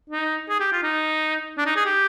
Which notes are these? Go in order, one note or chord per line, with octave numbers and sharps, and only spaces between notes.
D#4
G#4
G4
F4
D#4
D4
D#4
G#4
G4